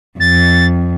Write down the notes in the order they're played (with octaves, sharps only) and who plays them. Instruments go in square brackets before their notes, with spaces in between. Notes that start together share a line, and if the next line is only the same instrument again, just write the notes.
[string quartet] F2 [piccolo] A6